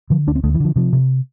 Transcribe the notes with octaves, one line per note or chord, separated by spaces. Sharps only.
D3 F3
D2 D4
C4
D2 A3
E3
D3 F3
C3 F3
C3